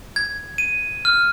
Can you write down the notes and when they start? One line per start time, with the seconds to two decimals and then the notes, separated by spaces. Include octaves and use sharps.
0.16 G#6
0.58 D#7
1.05 F6